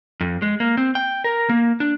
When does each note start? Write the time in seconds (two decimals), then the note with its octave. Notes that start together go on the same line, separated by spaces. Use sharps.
0.21 F2
0.42 G#3
0.60 A#3
0.77 C4
0.95 G5
1.24 A#4
1.49 A#3
1.80 D4